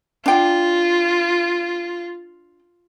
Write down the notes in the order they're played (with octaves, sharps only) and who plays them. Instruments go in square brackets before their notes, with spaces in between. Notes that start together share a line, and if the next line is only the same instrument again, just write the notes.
[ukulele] D4 G5 [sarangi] F4